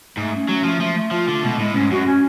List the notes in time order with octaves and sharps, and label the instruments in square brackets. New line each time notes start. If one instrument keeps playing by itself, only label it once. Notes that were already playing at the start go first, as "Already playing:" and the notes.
[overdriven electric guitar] G#2 [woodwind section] A3
[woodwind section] C#4
[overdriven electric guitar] F#3 [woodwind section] A3
[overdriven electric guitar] F3 [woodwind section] A3
[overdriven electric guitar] F3 [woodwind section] A3
[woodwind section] A3
[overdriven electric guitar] F3 [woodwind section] F4
[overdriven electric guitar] D3 [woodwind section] A3
[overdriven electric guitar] B2 [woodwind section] G#3
[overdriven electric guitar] A2 [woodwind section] G#3
[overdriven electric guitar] G#2 [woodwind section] C#4
[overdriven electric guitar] F#2 [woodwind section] F#4
[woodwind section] C#4